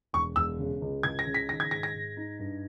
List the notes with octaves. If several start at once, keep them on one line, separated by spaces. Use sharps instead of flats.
E1 C#6
E1 E6
C#3
C#2
C#2 G#6
A#6
C#3
B6
D#3 A#6
G#6
G#2 A#6
A#6
G#2
D#4
G2